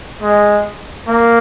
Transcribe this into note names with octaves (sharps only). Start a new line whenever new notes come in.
G#3
A#3